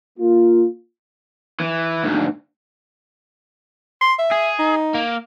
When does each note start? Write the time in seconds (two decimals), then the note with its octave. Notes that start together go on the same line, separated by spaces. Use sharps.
0.19 A#3 F4
1.60 E3
2.04 D2 G#2
4.01 C6
4.19 E5
4.32 G#4
4.59 D#4
4.94 A#3